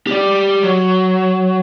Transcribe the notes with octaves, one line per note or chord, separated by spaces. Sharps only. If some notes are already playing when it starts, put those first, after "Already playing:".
G4 D5
F#3